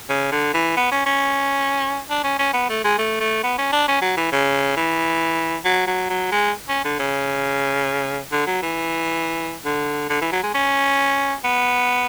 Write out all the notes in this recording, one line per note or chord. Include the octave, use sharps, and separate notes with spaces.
C#3
D3
E3
B3
C#4
C#4
D4
C#4
C#4
B3
A3
G#3
A3
A3
B3
C#4
D4
C#4
F#3
E3
C#3
E3
F#3
F#3
F#3
G#3
C#4
D3
C#3
D3
F#3
E3
D3
D3
E3
F#3
G#3
C#4
B3